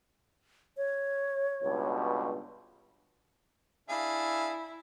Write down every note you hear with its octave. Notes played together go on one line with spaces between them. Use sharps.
C#5
C#2 G2 B2
D4 E4 G#4 F5